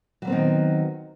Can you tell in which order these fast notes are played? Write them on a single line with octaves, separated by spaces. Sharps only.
F#3 G3 C4 B3 D#3